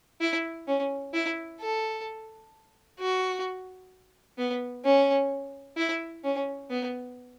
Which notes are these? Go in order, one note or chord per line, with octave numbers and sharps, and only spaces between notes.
E4
C#4
E4
A4
F#4
B3
C#4
E4
C#4
B3